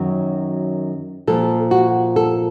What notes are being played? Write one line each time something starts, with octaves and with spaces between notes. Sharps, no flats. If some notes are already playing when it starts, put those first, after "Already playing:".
Already playing: F#2 D#3 F#3
A#2 F3 A4
F#4
A4